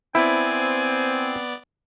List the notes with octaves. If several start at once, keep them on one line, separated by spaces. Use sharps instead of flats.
B3 C4 E4 D5 G#5